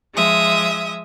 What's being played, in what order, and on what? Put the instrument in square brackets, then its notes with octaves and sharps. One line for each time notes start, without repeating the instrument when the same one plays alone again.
[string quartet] F3 G#3 E5 D#6